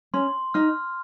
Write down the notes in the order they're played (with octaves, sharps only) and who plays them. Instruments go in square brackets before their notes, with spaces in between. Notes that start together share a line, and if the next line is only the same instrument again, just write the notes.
[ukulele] C#4 [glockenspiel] C6
[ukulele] D#4 [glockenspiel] F6